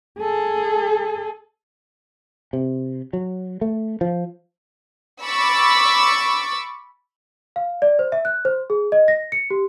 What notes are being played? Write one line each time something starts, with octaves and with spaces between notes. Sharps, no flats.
G#4 A4
C3
F#3
A3
F3
B5 C#6 D6 E6 A6
F5
D5
C5
E5
F#6
C5
G#4
D#5
A#6
C#7
G4